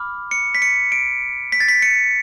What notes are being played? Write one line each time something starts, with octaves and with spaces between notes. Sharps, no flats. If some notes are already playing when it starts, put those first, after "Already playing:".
Already playing: B5 D6 F6
C#7
B6
C#7
D7
B6
A6
B6
C#7